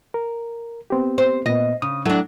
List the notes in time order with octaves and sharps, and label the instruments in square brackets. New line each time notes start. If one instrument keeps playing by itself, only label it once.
[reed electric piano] A#4
B3 C4 G4
[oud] C5
[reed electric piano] A#2 B3 [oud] D#5
[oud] C#3 [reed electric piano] D#6
[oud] F#3 D4 [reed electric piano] E4 A4